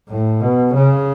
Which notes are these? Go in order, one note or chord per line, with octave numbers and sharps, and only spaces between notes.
A2
B2
C#3